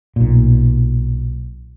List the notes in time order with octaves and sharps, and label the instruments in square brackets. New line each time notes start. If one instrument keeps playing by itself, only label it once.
[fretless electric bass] B1 A#2